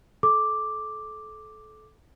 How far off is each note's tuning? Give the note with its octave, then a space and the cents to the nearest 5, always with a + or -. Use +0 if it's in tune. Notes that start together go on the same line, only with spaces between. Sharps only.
A4 -30 D6 +0